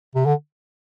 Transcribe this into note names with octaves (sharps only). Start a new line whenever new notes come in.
C3
D3